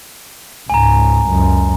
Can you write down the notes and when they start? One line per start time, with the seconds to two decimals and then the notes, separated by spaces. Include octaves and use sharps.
0.70 C#2 G#2 G#5 A#5
1.28 C#2 F#2